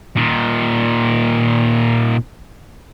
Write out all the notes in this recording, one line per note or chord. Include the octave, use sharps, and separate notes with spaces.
A#2 D#3